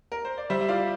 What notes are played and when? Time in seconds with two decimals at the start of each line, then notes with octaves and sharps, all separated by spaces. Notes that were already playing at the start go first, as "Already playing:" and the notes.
0.12 A#4
0.25 C5
0.38 D5
0.50 G3 C5 E5
0.61 E5
0.68 F4 D5 F5